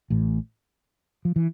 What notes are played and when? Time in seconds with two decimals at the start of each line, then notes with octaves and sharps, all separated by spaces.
0.10 A1 A2
1.25 F3
1.36 E3